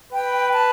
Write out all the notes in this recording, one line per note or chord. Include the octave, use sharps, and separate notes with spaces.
B4 G5
A5